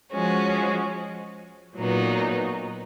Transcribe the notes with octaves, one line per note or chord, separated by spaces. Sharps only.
F3 G#3 C#4 F#4
A#2 F#3 B3 D#4